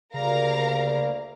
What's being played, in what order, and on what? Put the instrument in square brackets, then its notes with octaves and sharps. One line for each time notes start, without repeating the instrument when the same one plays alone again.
[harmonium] D2 G3 A#3 [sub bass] C#3 [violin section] A#4 F5 A#5